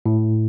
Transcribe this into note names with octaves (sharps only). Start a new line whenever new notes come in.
A2